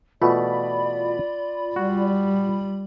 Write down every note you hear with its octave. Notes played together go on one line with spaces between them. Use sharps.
B2 E3 A3 F4 D5 B5
G3 F#4